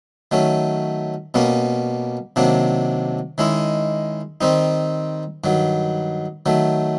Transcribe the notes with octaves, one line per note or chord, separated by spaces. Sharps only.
D#3 F#3 A3 C#4
B2 G3 A#3 C#4
C3 D#3 F#3 A#3 D4
D#3 G#3 C#4 E4
D#3 G3 C4 D#4
G2 D#3 F#3
D#3 F#3 A3